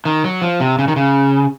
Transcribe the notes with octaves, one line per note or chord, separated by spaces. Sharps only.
D#3
F#3
F3
C3
C#3
D#3
C#3